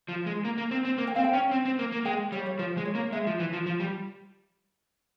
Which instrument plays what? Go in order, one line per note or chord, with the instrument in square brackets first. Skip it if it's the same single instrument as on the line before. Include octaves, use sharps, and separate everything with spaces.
[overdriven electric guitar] F3
G#3
A#3
A#3
C4
C4
A#3
[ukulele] G5
[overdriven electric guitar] C4 [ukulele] F5
[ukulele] G5
[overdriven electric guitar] C#4
C4
C4
A#3
A#3
[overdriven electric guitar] G#3 [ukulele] G5
[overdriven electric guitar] G3 [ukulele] C#5
[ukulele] C#5
[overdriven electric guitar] F3 [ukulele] C5
[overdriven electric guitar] G#3
[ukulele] C#5
[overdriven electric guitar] A#3
[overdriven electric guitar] G#3 [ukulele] E5
[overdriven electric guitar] F3
E3
F3
F3
G3